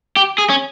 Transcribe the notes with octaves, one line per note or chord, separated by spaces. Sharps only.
G4
G#4
C#4